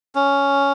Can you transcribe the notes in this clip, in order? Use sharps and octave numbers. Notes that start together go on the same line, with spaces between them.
C#4